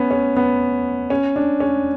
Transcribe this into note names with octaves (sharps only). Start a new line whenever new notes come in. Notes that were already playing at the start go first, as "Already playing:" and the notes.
Already playing: B3 C#4
C#4
B3
C#4
D4
C#4